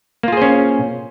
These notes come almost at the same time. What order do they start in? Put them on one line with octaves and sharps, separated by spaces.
A#3 F4 G#4 C5 C#4